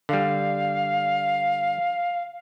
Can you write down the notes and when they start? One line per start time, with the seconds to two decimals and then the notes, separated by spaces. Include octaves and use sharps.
0.09 D3 G3 F5